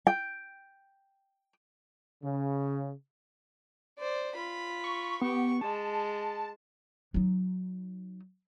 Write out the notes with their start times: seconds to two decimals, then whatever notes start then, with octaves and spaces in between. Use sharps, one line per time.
0.07 G5
2.23 C#3
3.99 C5 D5
4.35 F4 B5
4.84 C#6
5.21 B3 G4 C#6
5.61 G#3 A5
7.14 F#3 D#4